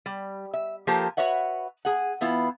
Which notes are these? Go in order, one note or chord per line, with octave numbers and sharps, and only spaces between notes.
G3
E5
F3 A#3 G4 A4 A#4 C5
F#4 B4 C#5 E5 F#5
G#4 F#5
E3 B3 E4 F4